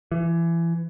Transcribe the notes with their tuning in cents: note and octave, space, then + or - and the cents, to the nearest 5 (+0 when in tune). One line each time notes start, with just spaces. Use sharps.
E3 +25